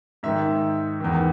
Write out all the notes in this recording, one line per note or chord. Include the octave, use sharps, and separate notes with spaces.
G#2 D#3 E5
E2 D#3